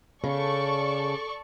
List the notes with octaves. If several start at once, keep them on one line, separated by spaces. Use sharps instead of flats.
C#3 A4 D5 C#6